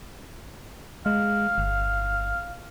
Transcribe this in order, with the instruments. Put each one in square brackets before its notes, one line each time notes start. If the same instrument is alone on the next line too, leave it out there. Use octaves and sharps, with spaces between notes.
[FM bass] G#3 [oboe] F5
[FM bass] G1